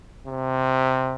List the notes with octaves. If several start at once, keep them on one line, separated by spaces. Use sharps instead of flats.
C3